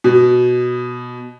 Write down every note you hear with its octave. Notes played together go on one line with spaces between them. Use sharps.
B2